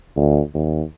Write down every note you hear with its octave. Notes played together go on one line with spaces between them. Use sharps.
D2
D#2